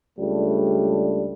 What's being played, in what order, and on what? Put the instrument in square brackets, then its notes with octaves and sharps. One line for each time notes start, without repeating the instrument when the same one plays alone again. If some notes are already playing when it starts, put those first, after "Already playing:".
[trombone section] C#2 G3 A3 D4